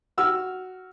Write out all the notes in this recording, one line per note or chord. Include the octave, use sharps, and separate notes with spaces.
F#4 E6 F6